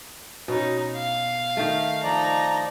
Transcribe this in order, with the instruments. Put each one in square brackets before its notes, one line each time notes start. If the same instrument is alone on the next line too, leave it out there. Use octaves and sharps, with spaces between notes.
[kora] B2 [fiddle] C#4 D#4
[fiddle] F5
[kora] D#3 A3
[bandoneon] F3 D5 [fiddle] D#4 A#5